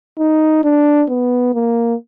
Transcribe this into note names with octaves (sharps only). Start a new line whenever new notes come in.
D#4
D4
B3
A#3